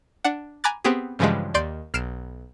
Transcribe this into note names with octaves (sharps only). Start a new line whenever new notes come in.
D4 F#5
G#5 A#5 B5 D6 F#6 A6
B3 C4 G4 G#4
G2 C#3 E3 F3 G3 G#3
D#2 D5 C6 G6 D7
B1 F6 C7 D7 E7